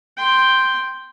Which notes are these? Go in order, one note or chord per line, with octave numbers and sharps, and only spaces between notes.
G5 C6